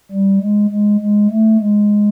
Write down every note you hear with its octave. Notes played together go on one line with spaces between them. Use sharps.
G3
G#3
G#3
G#3
A3
G#3